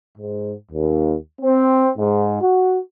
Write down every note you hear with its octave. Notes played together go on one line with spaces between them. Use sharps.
G#2
D#2
C4
G#2
F#4